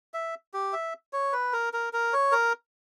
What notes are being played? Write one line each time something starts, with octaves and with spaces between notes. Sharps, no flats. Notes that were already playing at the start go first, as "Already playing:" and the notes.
E5
G4
E5
C#5
B4
A#4
A#4
A#4
C#5
A#4